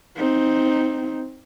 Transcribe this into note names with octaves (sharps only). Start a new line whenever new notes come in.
C4 D#4